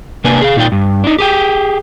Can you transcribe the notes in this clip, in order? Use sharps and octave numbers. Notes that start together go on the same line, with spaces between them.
C3 A#3 D4 B4 G#5
G#4 F5
A#2 D#4 F4 D5 G5
G2
D4 D#4
G4 G#4 G5